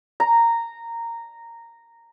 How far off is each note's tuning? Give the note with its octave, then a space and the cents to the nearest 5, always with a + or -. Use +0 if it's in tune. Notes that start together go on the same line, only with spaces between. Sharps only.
A#5 -10